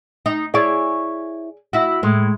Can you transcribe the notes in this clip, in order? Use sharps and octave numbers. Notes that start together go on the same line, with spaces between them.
D#4
E4 G#4 C#5 D5
E4 F#4
A2 G#3